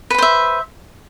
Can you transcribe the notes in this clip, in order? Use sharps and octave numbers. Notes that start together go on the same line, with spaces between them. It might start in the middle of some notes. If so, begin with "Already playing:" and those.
B4 C5 E5 B5